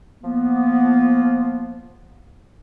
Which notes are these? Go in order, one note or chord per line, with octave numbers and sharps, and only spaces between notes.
F3 A#3 B3